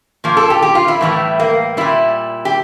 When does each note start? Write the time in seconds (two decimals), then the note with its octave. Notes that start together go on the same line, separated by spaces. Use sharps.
0.24 A#2 F3 A#3
0.37 A4
0.50 G4
0.62 G4
0.75 F4
0.88 E4
1.01 A2 E3 G3
1.39 A#3
1.77 A#2 G3 E4
2.45 G4